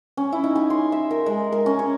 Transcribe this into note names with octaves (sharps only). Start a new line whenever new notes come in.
C#4
E4
D#4
G#5
C6
E5
A#4
G#3
A#4
C#4
C#5